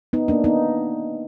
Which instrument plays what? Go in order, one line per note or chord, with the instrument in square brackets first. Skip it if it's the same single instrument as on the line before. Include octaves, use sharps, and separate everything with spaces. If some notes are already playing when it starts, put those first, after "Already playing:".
[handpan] B3 D#4
A#3 D4
B3 D#4